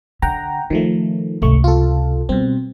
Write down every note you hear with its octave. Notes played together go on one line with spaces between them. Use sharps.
D3 F#5 G5 A#5
D#3 F3 A3 D#4
G#1 C#2 C3 A3 C#6
F4 A4
B2 G3 C4